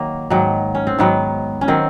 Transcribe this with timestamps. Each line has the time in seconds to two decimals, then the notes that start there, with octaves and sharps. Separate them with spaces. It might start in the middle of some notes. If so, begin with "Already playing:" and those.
Already playing: D#3 F#3 A#3
0.30 G#2 D#3 F#3
0.75 C#4
0.87 C4
0.99 G#2 D#3 F#3 B3
1.61 C#4
1.68 D#3 F#3 C4